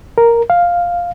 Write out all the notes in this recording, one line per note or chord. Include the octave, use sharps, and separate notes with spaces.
A#4
F5